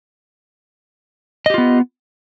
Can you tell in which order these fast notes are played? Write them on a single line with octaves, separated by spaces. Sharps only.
D#5 G4 F4 B3